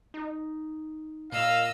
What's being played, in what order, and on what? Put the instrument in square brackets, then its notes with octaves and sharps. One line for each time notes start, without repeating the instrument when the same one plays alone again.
[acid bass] D#4
[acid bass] A#2 [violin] D#5 E6 [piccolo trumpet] F5